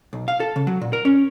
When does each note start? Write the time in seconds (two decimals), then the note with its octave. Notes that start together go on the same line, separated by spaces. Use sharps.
0.13 B1
0.28 F5
0.40 A4
0.56 C#3
0.67 F#3
0.81 A#2
0.93 A#4
1.05 C#4